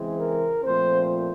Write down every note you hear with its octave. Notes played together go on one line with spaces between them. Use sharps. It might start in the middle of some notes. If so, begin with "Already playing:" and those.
Already playing: C#3 E3 G#3 C4
A#4
A#2 F3 A3 C4 C5